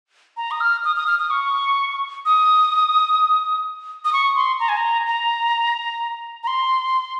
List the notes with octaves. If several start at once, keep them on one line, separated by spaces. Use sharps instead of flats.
A#5
D#6
F6
D#6
D#6
F6
D#6
C#6
D#6
D#6
C#6
C6
A#5
G#5
A#5
A#5
A#5
C6